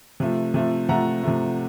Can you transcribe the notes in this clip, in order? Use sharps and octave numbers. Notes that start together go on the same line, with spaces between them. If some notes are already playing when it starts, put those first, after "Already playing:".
C3 F3 A3
C3 F3 A3
C3 F3 A3 F#5 A#5
C3 F3 A3